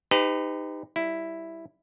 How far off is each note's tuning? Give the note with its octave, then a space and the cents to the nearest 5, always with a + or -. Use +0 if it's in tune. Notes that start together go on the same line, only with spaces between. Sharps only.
D#4 +0 G4 +25 B4 +40
G3 +0 E4 +0